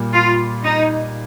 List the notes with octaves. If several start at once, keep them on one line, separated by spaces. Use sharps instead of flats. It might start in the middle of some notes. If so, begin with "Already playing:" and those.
Already playing: A#2 G3 A#3
F4
D#4